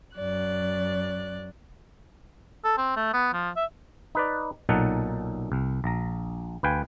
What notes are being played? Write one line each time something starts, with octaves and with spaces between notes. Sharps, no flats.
F#2 D5 F#6
A4
C4
A3
B3
F3
E5
D#4 B4 D5
B1 A#2 F#3 D#4 A4 F#5
C2
A#1 A#5
D2 B4 F5 G5 G#5